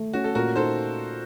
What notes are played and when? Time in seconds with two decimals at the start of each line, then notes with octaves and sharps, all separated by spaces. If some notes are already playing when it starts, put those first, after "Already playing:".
Already playing: A3
0.13 C#4 F#4
0.24 A4
0.35 A#2 F#4 A#4
0.55 D#4 A4 C5